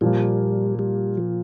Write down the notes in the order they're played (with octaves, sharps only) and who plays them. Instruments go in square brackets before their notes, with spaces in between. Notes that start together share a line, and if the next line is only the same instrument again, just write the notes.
[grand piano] A#2 F3 A#3 [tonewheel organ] G3
[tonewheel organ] G3
F3